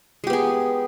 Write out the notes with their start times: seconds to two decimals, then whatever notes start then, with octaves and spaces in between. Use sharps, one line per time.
0.24 G#3
0.27 G4
0.30 B3
0.33 G#4